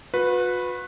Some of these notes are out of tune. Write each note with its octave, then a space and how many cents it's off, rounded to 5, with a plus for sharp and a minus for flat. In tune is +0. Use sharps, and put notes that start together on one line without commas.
F#4 -40 B4 +0